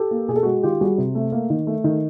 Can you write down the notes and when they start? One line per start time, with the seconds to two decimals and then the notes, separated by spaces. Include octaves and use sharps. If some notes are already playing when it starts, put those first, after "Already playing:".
Already playing: G4 A4
0.11 A#3
0.28 B2 G#4
0.36 A4
0.43 G#3 F#4 G#4
0.63 D#3 F4 G4
0.81 G3 F#4 G#4
0.98 C3
1.15 A3
1.32 A#3
1.50 D#3
1.67 A3
1.84 D#3